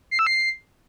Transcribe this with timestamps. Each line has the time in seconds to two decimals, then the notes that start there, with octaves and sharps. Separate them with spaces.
0.11 C7
0.19 E6
0.27 C7